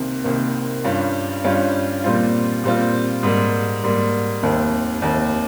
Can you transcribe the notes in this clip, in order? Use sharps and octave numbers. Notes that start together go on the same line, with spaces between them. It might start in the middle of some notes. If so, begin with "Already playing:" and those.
Already playing: C2 C3 D#3 A#3
C2 C3 D#3 A#3
G2 G3 C#4 F4
G2 G3 C#4 F4
A#2 G3 C4 F4
A#2 G3 C4 F4
G#2 G3 A#3
G#2 G3 A#3
F1 D#2 D#3
F1 D#2 D#3